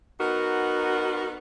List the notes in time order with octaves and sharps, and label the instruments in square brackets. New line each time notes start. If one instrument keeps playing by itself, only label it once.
[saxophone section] B3 D#4 F#4 A#4